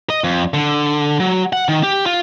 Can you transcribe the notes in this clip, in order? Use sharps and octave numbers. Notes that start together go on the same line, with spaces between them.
D#5
F2
D3
F#3
F#5
D#3
G4
F4